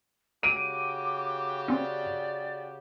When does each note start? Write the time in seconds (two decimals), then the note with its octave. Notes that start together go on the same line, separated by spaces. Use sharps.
0.43 C#3 F#4 G4 D6 D7 D#7
1.68 C4 C#4 D5